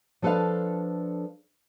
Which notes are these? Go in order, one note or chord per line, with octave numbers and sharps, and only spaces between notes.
F3 D4 A4 B4 D5 F5